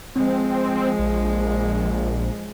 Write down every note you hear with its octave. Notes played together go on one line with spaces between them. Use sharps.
F3 G#3 C4
A#1